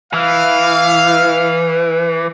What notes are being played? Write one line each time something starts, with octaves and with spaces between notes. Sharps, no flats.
E3 F5